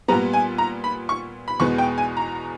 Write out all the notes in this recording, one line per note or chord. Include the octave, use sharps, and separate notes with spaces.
A#2 G3 B3 A#5
G#5
A#5
B5
C#6
B5
E2 B2 G#3 B3 C#6
G5
G#5
A#5